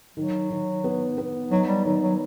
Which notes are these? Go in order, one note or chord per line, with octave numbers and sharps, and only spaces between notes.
D#3 F#3
D#3
B3
B3
F#3 D#4
G3
D#3 F#3
F#3